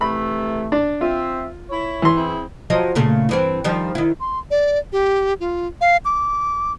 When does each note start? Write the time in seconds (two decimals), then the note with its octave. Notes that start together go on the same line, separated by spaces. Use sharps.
0.01 C3 E3 A3 B5
0.72 D4 D5
1.01 C4 F4 E5
1.70 E4 C#5
2.02 E3 C6
2.16 C4 E4 G#4
2.70 F3 F#3 D#5
2.95 A#2 C#3 A3
3.29 G2 E3 C4
3.64 D#3 F3 G3
3.95 D#3 E4
4.20 C6
4.51 D5
4.92 G4
5.40 F4
5.81 F5
6.05 D6